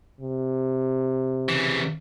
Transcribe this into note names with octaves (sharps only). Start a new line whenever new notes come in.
C3
C#3 E3